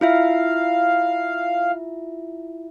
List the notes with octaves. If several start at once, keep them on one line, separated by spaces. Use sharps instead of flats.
E4 F4 E5 F5